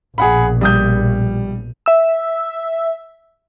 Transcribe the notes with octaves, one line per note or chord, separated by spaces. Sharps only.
A#1 B2 G#4 F#5 B5
G3 D#6 G6
E5 E6